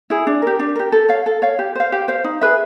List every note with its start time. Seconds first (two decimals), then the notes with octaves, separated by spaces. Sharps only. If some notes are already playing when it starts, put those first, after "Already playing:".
0.10 E4 G#4
0.27 D4
0.42 G4 A#4
0.59 D4
0.76 G4 A#4
0.92 A4
1.09 C#5 F5
1.26 A4
1.42 C#5 F5
1.59 G4
1.75 C5 F5
1.92 G4
2.08 C5 F5
2.24 D#4
2.41 G#4 B4 E5